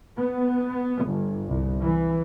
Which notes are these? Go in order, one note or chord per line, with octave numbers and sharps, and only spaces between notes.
B3
G1
C2
E3